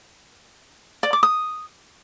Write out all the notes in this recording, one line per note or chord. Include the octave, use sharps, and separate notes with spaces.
D5
D6
D#6